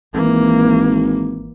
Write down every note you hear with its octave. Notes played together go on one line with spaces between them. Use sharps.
G#1 E3 A#3